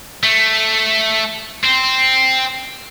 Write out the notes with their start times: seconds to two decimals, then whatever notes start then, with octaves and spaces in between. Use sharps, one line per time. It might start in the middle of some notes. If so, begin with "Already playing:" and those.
0.23 A3
1.64 C4